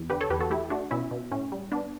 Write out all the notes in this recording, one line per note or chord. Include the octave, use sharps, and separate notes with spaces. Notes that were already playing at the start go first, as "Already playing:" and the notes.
Already playing: E2
D3 G4 B4
A4 C#5
E2 G4 B4
F#4 A4
A3 E4 G4
A3 D4 F#4
B2 C#4 E4
B2
A2 C#4
G3
B3 D4